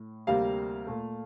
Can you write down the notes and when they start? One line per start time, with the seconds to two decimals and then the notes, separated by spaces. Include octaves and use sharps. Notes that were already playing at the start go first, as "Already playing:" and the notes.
Already playing: A2
0.27 D2 C3 G3 A#3 F5
0.87 A#2 A3